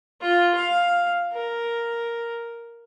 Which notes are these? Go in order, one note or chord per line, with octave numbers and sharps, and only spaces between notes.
F4
F5
A#4